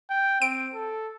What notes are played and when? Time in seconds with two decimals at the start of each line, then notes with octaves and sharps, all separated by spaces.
0.10 G5
0.42 C4 D7
0.74 A4